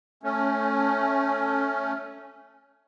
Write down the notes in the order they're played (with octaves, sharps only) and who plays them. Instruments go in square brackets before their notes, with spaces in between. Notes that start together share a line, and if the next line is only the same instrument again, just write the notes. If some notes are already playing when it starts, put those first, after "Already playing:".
[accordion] A3 C#4